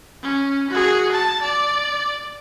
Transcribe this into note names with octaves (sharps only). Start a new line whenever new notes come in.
C#4
F#4 G#4
A5
D5